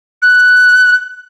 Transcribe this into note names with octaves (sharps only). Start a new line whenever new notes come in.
F#6